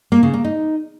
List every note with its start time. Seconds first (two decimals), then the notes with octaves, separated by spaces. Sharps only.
0.12 A#3
0.23 C#3
0.34 A#3
0.44 D#4